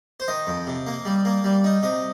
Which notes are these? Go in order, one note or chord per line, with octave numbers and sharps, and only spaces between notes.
C5
D#3 D#5
F2
C3
A#3
G3
A#3
G3
D#4
C3 D#5